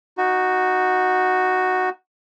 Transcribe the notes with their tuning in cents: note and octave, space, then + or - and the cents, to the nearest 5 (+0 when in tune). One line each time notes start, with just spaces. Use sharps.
D#4 +0 F#4 +0